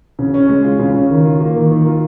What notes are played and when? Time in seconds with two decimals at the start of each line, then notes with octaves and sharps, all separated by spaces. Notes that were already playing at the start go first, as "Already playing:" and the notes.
0.19 C#3
0.34 C#4
0.49 G#3
0.64 F4
0.79 C#3
0.95 C#4
1.10 D#3
1.25 F4
1.41 A#3
1.56 D#3
1.71 D#3
1.86 F4